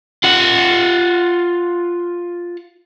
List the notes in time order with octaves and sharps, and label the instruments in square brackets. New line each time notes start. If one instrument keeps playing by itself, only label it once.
[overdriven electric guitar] F4 F#5